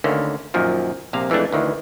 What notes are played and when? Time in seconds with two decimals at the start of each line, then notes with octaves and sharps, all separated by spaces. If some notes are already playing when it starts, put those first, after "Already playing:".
0.04 D2 D3 D#3 A#3 C#4
0.54 F#2 A#2 D#3 F3
1.13 A#1 C3 A#3 F5
1.30 F2 E3 G#3 A3 D4
1.52 D2 D#3 E3